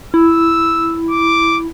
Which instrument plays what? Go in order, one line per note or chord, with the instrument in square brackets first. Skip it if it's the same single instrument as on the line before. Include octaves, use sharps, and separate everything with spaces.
[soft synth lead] E4 [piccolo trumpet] E6
[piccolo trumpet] D6